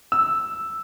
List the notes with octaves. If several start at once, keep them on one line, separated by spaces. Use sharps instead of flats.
E6